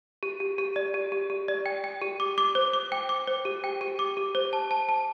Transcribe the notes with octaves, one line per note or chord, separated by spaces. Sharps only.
G4
G4
G4
D5
G4
G4
G4
D5
G5
G5
G4
D6
D6
C5
D6
G5
D6
C5
G4
G5
G4
D6
G4
C5
A5
A5
A5